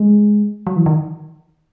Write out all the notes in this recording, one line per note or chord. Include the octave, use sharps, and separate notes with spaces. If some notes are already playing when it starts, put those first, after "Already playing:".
Already playing: G#3
F#3
E3
D#3